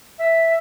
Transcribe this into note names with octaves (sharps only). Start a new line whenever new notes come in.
E5